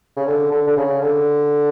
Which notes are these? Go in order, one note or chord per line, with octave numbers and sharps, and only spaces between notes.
C#3
D3
D3
D3
C#3
D3